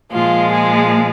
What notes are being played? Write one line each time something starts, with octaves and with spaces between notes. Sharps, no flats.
A#2 F3 G#3 F4
G#4